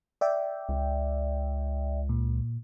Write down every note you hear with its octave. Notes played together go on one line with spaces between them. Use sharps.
D5 E5 G5
C#2
A#2